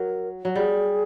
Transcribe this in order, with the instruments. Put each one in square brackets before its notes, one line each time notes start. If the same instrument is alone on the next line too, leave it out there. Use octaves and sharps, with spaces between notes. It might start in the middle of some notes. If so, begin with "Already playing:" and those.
Already playing: [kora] F#3 [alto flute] A#4
[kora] F#3
[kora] G3 [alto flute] G#4